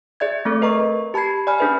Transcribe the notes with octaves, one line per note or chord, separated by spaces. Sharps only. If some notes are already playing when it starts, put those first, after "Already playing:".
G#4 D5 E5 G#6
A3 C4 A4
A#4 B4 D#5 A#5 C#6
G4 A5 B5 G#6 C7
D5 G#5 B5 F6
C#4 D4 G#4 B4 E5 G#5